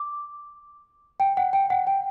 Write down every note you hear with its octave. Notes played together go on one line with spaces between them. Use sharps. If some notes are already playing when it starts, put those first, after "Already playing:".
Already playing: D6
G5
F#5
G5
F#5
G5